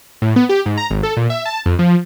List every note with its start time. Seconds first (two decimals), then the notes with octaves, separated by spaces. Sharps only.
0.22 A2
0.36 B3
0.49 G4
0.66 G#2
0.77 A#5
0.90 G#1
1.03 A4
1.17 A#2
1.30 E5
1.45 A5
1.66 F2
1.79 F3